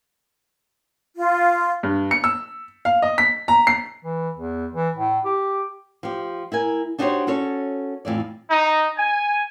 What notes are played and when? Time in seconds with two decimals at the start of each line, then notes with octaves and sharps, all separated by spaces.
1.17 F4
1.83 G2
2.11 C#7
2.24 E6
2.85 F5
3.02 D#5
3.18 B6
3.48 A#5
3.67 C7
4.05 E3
4.36 E2
4.74 E3
4.96 A2
5.25 G4
6.03 F3 G4
6.52 E4 A#4 G#5
6.98 D4 D#4 F#4 G4 C5 C#5
7.27 C#4 F#4 A4 C#5
8.05 F2 A2 E3 D5
8.50 D#4
8.98 G#5